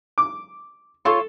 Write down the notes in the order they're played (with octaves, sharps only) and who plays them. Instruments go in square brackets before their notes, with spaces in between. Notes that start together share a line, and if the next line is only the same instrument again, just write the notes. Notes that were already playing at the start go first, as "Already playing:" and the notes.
[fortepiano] D6
[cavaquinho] F4 C#5 C6 [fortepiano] A4